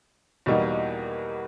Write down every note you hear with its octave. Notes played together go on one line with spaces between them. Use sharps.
E2 B2 G3 A#3 D#4